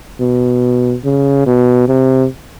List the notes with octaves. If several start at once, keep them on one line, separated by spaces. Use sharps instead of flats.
B2
C#3
B2
C3